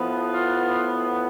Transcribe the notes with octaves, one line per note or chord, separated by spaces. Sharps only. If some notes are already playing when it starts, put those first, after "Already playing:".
Already playing: A2 F3 B3
F4